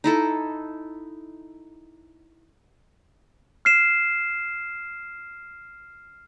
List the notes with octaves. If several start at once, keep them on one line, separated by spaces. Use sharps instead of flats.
D#4 E4 A4
F6 C7 E7